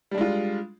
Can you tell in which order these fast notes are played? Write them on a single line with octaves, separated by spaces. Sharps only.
G3 D4 G#3 F4